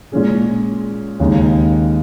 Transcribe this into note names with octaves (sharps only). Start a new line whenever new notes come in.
A#2 G#3 C#4 G#4
D#2 C#3 G#3 D#4